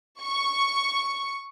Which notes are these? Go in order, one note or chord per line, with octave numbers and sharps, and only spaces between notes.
C#6